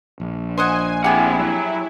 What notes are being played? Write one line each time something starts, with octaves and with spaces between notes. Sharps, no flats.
A#1
C5 D#5 F#5 G#5
C4 E4 G4 G#4 F#5
F#3